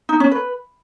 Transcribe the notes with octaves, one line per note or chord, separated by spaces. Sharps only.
D#4
C#4
B4